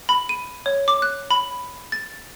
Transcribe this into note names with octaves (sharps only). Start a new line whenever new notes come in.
B5
D#7
C#5
D6
F#6
B5
A6